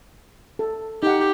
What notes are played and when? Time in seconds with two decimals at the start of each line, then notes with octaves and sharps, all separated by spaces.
0.59 A4
1.03 D#4 G4 F#5